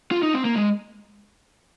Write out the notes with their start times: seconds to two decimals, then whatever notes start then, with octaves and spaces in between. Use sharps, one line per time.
0.11 F4
0.23 D#4
0.34 C4
0.45 A#3
0.56 G#3